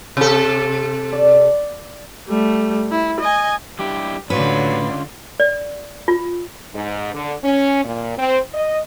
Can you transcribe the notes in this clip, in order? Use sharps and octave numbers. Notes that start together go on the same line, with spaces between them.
C3 A4
D5
G3 A3
E4
D#5 G#5
G3 D4 E4 G4
A2 D3 F#3 C#4 F4 B4 D5
D5
F4
G#2
D3
C#4
A#2
C4
D#5